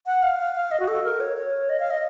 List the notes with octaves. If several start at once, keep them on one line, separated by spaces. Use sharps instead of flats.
F#5
F5
F5
F5
D#5
F#4
A4
A#4
C#5
C#5
D#5
F5
D#5